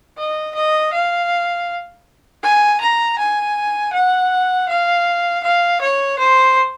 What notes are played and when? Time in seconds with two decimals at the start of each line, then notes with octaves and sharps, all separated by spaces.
0.17 D#5
0.55 D#5
0.93 F5
2.43 G#5
2.81 A#5
3.18 G#5
3.93 F#5
4.68 F5
5.43 F5
5.81 C#5
6.19 C5